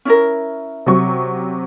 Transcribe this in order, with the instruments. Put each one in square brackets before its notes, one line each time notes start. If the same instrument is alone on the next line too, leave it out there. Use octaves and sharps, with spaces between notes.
[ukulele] C#4 E4 A#4
[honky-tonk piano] C3 F#3 C#6